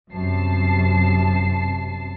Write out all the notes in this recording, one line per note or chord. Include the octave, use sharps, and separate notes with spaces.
G1 F#2 C3 A5 C7